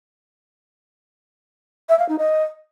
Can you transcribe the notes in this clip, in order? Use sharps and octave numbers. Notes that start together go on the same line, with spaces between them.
E5
F5
D#4
D#5